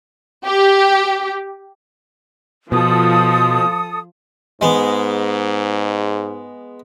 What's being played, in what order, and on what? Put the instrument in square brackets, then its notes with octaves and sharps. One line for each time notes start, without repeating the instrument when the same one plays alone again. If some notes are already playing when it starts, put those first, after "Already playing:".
[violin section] G4
[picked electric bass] B2 [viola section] F3 [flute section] A4 D#6
[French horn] G#2 [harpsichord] G#3 B3